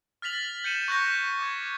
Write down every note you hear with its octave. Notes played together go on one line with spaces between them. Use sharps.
F6 A6 B6 F7 F#7
G6 C#7 D#7 E7 F#7
C#6 F#6 G6 A#6
D6 G#6